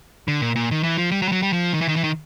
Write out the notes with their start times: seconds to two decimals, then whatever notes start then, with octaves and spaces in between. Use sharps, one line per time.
0.28 D3
0.41 A#2
0.56 A#2
0.71 D#3
0.83 E3
0.98 F3
1.11 G3
1.22 F#3
1.28 G3
1.32 F#3
1.42 G3
1.53 F3
1.74 D#3
1.81 E3
1.88 D#3
1.96 E3
2.04 D#3